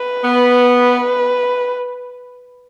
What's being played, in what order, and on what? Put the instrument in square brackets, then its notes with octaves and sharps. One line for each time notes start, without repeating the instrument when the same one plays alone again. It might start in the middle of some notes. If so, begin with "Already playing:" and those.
Already playing: [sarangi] B4
[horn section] B3
[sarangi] B4